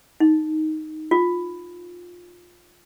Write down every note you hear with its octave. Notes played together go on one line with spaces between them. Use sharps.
D#4
F4